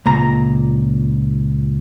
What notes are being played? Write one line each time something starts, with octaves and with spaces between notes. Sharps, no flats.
C#2 A#2 A#5